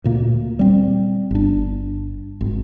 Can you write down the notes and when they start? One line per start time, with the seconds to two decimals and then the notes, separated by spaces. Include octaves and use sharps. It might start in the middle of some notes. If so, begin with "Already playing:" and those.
0.04 D2 A#2 A#3
0.59 G3 C4
1.31 G1 D4
2.41 G#1